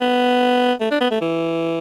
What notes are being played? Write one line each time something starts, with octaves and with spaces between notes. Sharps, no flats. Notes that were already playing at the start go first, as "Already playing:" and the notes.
B3
A3
D4
B3
A3
E3